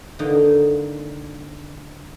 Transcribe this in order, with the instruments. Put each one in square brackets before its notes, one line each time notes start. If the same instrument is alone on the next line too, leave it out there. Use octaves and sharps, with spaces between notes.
[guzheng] D3 D#3 A#3 D#4